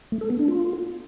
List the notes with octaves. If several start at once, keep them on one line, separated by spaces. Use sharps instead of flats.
A3
A4
B3
D4
F4